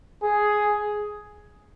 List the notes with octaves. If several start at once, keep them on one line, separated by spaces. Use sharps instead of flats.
G#4